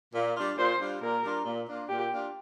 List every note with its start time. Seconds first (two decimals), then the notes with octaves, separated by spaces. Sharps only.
0.14 A#2
0.36 G3 D4 F4
0.58 A#2 C5
0.80 G3 D4 F4
1.01 A#2 A#4
1.23 G3 D4 F4
1.45 A#2
1.68 A#3 D4 F4
1.89 A#2 G4
2.12 A#3 D4 F4